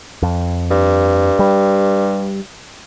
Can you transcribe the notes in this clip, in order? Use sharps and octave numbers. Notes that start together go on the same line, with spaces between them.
F2
G2
G3